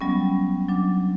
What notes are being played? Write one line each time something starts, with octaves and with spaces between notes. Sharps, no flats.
F#3 G3 B3 C#4
F#3 D4